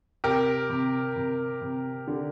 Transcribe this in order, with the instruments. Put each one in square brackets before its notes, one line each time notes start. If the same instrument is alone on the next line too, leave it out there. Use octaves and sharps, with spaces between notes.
[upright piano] C3 [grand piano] G4 A#4
[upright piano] C3
C3
C3
D3